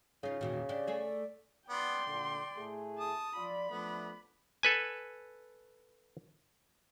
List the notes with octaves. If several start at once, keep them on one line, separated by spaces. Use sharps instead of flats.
C#3 D#4 F4
E2 A#2 D#3 F#4
D4 G4 D5
A3 G#4
B3 D5 G5 C6
A#2 D3 D5
A2 A3 G#4
A5 D#6
F3 F4 D5 B5
F3 A3 B3 D4
A4 B4 G#5